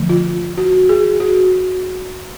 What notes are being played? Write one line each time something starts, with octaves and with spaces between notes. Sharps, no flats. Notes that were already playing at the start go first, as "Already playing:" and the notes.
Already playing: D3 F3 A3
F4
F#4
G#4
F#4